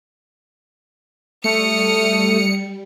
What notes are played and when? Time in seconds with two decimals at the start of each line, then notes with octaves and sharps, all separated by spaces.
1.44 G3 A3 D#6 F6 C#7